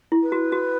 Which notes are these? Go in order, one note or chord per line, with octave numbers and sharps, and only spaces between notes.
E4
B4
F#4
F#4